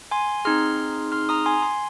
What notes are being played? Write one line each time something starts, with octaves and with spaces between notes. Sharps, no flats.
G#5 C6
C4 D#4 G#4 C6 F6
C6 F6
A#5 D#6
G#5 C6
G#5 C6